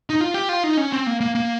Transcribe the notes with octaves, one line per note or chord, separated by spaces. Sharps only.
D#4
F4
G4
F4
D#4
C#4
C4
A#3
A#3
A#3